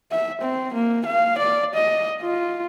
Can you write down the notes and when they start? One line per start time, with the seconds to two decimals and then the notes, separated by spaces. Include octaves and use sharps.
0.11 E5
0.41 C4
0.74 A#3
1.06 F5
1.38 D5
1.74 D#5
2.22 F4